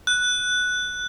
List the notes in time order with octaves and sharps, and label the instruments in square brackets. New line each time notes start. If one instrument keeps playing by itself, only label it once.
[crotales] F#6